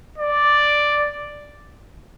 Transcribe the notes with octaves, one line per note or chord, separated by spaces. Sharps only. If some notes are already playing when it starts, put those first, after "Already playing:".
D5